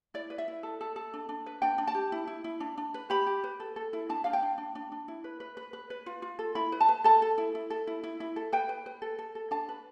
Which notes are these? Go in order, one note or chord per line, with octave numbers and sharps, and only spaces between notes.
E4 D5
B4
E5
E4
A4
A4
A4
D4
D4
B4
D4 G5
D4
A5
G4
E4
E4
E4
D4
D4
B4
G4 B5
G4
B4
A4
A4
E4
D4 A5
D4 F5
G5
D4
D4
D4
D4
E4
B4
B4
B4
B4
B4
F4
F4
A4
E4 B5
B4
A5
B4
A4 A5
A4
E4
E4
A4
E4
E4
E4
A4
B4 G5
B4
B4
A4
A4
A4
D4 A5
B4